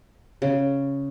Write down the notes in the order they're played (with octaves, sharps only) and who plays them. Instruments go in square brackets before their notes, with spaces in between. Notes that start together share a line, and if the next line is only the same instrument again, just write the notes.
[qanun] C#3